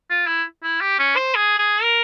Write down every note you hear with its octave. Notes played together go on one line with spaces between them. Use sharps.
F4
E4
E4
G4
C#4
C5
G#4
G#4
A#4